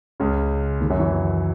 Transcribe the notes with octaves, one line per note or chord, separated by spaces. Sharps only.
C#2 C#3
D#2 D#3
F#2 F#3
E3